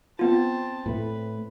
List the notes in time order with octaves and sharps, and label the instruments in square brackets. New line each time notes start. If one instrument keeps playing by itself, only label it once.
[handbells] B3 F4 [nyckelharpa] C4 A5
[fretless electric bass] A2 A3 [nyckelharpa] B4